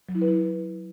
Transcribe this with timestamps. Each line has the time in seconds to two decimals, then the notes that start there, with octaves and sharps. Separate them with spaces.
0.09 F#3
0.15 E4
0.21 B4
0.28 E4